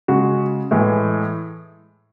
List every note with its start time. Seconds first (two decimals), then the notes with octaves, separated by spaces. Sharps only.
0.08 C#3 G#3 F#4
0.71 A2 E3 G#3